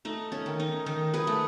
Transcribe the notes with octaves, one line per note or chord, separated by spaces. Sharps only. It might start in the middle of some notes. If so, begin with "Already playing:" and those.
A3 D#4
C#4
D#3
D#4
D#3 D#4
G#4 B4
A3